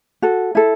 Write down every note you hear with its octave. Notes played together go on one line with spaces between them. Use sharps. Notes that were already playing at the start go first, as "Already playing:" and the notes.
F#4 A4
E4 A4